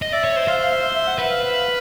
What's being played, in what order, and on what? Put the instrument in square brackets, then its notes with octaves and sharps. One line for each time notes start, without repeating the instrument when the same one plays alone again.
[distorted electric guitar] D#5
[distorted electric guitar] D5 [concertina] E5
[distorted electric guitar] C#5
C5
[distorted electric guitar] C5 [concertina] F5
[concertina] F5
E5
E5
E5
F#5
[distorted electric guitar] B4 [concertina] F#5
[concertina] F5
F5